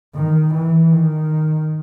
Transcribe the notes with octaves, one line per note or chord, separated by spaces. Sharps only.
D#3
E3
D#3